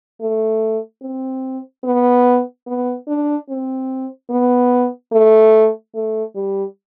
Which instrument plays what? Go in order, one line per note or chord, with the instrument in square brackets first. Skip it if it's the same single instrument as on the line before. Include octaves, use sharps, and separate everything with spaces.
[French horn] A3
C4
B3
B3
D4
C4
B3
A3
A3
G3